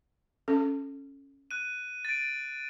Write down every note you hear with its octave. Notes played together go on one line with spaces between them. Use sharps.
C#4 A4
F#6 D#7
A6 D7